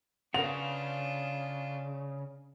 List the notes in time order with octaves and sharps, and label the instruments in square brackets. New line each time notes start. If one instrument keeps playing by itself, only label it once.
[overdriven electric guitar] C#3 [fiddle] D4 F4 [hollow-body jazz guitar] A#4 B4 F#5 [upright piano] F7